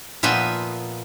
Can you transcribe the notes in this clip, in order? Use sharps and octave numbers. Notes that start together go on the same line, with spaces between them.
A#2 F3 B3 D#5 E5